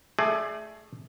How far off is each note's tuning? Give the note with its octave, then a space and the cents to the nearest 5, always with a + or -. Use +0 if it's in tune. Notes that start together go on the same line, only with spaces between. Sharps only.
A3 +0 G#4 +15 D5 +30